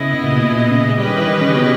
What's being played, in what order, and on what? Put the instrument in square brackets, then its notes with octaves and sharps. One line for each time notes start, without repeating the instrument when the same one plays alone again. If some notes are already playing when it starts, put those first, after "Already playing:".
Already playing: [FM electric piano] C#3 [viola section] B3 E4 G#4 D#5
[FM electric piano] C#3
A#2
B2
A#2
B2
C#3
G#3
[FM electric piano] G3 [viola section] C#4 G4 B4 D#5
[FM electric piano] D#3
E3
D#3
C#3
B2